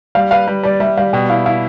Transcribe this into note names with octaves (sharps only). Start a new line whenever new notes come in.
G3 F5
B4 F5
G3
G3 D5
G3 E5
G3 F5
B2 G5
E4 F5
E4 F5